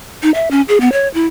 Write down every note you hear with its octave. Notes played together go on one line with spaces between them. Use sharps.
D#4
E5
C#4
G#4
B3
C#5
E4